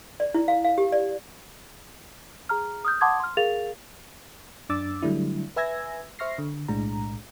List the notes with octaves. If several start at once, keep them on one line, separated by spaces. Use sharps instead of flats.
D5
E4
F5
F5
G4
D5
G#4 A#5 F6
D#6 F6 G6
F#5 A5 C6 D6 D#6 G#6
C6 F6
G#4 A#4 F5 A6 F7
F#2 D4 D6 E6 A6
D3 F#3 G3 A3 D4 E4
B4 E5 G#5 E6 G#6 A#6
C5 E5 C#6 F6 A#6 C7
D3
B1 A2 G#3 D4 A#5